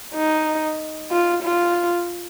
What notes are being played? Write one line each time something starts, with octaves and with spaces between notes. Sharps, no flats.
D#4
F4
F4